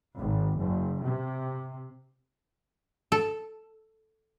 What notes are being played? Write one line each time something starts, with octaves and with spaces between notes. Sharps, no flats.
G#1
F#1
C3
A4